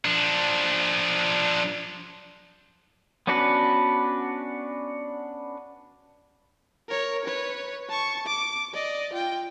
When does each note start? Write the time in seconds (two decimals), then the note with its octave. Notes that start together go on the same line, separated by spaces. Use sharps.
0.05 F3 D4
3.27 B3 C#4 D4 F#4 B4
6.88 A#4 C#5
7.25 B4 C#5
7.89 A5 C#6
8.26 D6
8.74 D5 D#5
9.13 F4 G5